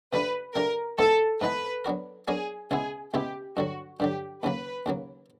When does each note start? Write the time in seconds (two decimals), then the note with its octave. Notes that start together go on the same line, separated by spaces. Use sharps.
0.12 C3 F3 A3 D4 B4
0.55 C3 F3 A3 D4 A#4
0.98 G#2 E3 G#3 B3 A4
1.41 G#2 E3 G#3 B3 B4
1.85 F#3 B3 D4 F#4 A#4
2.28 F#3 B3 D4 F#4 G#4 A#4
2.71 C#2 B2 G#3 B3 E4 G#4
3.13 C#2 B2 G#3 B3 E4 G4
3.56 G2 D3 F#3 F#4
4.00 G2 D3 F#3 G4
4.43 D#2 C#3 F#3 A#3 B4
4.86 D#2 C#3 F#3 A#3